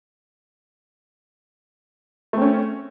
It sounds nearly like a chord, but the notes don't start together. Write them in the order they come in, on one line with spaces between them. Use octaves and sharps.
A3 C4 C#4